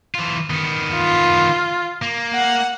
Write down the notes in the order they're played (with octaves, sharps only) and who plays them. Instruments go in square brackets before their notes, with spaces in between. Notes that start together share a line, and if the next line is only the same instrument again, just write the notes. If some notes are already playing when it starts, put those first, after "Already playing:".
[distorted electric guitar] E3 F4
D#3 B3
[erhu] F4
[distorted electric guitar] A#3
[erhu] F#5